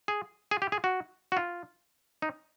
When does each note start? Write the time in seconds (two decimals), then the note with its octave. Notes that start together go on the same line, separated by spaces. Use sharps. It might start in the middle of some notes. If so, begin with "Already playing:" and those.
0.08 G#4
0.51 G#4
0.62 G4
0.72 G#4
0.84 F#4
1.32 F#4
1.37 F4
2.22 D#4